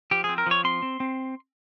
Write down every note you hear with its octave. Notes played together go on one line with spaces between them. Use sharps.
F3 G4
G#4
C4
A#4
F3 C#5
C4 C6
C4
C4